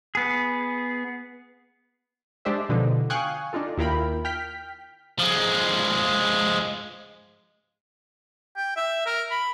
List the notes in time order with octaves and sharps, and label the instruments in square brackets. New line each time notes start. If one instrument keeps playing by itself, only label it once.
[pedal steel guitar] B3 G#4
[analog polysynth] G#3 D4 G4 C5 E5
B2 D3 F3 D4 D#4
F5 G5 G#5 C#6 D#6 F#6
D4 D#4 F4 A4
D#2 E4 F4 A#4 G5 B5
G5 F6 G6 B6
[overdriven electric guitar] F3 G#3
[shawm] G5
E5
A#4
B5